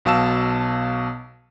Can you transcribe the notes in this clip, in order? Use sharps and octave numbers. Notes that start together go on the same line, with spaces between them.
B1 B2 F5 A5 E6 E7